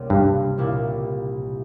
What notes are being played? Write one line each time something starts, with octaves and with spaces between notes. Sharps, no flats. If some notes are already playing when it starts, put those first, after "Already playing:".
Already playing: C#2 C3 G3 A#3
G2
C2 A#2 G3 A#3 E4